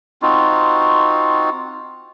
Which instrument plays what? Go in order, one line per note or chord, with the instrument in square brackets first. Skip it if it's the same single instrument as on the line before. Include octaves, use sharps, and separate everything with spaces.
[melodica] C4 D#4 F4 F#4